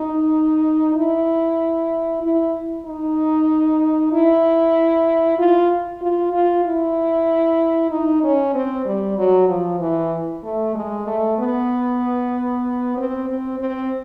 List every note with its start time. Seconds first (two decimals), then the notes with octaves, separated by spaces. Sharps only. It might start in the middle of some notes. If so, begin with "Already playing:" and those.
Already playing: D#4
0.96 E4
2.22 E4
2.86 D#4
4.12 E4
5.38 F4
6.01 F4
6.33 F4
6.65 E4
7.91 D#4
8.23 C#4
8.54 C4
8.85 G3
9.18 F#3
9.48 F3
9.80 E3
10.44 A3
10.75 G#3
11.07 A3
11.38 B3
12.97 C4
13.28 C4
13.59 C4